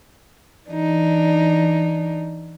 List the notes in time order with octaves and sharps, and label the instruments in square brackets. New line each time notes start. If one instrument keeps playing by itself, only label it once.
[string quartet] E3 D4 D#4